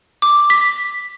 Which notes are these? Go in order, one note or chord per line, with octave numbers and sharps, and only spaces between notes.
D6
B6